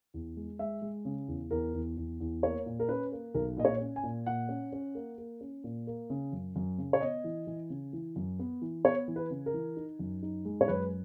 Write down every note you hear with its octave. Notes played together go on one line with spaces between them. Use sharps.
E2
G#3
G#3 E5
G#3
C#3
E2
E2 A#4
E2
E2
E2
A#3 C#5
A#2
A#4
C#4 B4
A#3
B1 A#4
A#2 D#5
C#5
C#4
G#5
A#2
A#2 F#5
C#4
C#4
A#3
A#3
C#4
A#2
A#3
C#3
F#2
F#2
C#3
C#5
B3 D#5
E3
E3
C#3
E3
F#2
B3
E3
B3 C#5
E3
B4
C#3
A#4
E3
D#4
F#2
D#4
G#3
C#5
F#2 B4